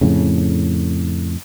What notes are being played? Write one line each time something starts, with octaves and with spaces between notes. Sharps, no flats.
F2 A2 C#3